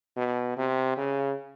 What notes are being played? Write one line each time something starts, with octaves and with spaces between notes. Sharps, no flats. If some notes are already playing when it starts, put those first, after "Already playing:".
B2
C3
C#3